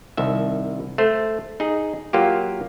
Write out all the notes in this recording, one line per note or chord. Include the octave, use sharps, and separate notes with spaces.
C2 D#3 E5
A3 C5
D#4 G#4
F#3 A#3 F4 G4